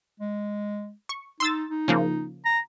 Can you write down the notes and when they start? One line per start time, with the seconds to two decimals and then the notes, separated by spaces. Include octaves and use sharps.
0.20 G#3
1.09 C#6
1.40 D#4 C6 E6 A6
1.70 D#4
1.88 C#3 F3 A#3
2.45 A#5